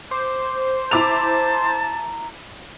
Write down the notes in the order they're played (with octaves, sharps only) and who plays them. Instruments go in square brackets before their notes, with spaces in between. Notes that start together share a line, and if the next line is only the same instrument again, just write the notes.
[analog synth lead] C5 [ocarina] D6
[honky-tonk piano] E4 D6 F7 [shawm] A5 [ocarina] A#5